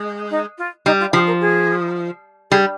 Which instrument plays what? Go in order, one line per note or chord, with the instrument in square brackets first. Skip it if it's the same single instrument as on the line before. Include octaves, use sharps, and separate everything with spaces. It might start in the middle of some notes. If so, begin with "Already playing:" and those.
Already playing: [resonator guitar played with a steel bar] G#3
[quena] D#4
F4
[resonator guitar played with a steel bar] G3 [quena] D#4
[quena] F4
[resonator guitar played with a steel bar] F3 [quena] G4
[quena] A#4
G#4
[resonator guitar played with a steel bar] G3 [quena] G#4